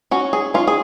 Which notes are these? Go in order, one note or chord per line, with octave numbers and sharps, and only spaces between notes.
C#4 F#4
G#4
C#4 F4
G#4